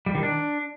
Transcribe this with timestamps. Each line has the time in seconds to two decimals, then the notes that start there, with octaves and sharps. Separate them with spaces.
0.06 G3
0.15 D#3
0.23 D4